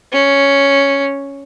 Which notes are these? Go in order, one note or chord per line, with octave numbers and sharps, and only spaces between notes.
C#4